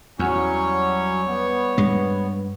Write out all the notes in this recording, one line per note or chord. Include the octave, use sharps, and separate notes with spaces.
E2 F#3 G3 C#4 C#5
B3
G2 G#3